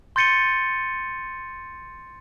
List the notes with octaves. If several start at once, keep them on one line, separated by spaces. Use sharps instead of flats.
C6 G6 A6 C#7 D#7 G7